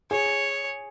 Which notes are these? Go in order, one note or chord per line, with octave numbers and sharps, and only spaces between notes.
G#4 C#5